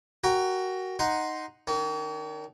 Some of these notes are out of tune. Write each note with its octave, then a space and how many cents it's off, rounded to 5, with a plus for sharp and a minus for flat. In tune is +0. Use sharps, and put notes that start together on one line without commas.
F#4 +15 A#4 +0 G5 +25
D#4 +0 F#5 +0 C6 +0
D#3 -10 C#4 +45